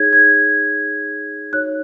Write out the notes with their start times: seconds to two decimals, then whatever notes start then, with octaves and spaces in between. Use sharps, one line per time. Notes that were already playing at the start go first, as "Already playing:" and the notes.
Already playing: D#4 G#4 C#5 G#6
0.13 G#6
1.53 D#4 F#4 C#5 F#6